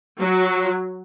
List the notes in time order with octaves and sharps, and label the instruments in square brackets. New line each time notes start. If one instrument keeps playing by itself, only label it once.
[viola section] F#3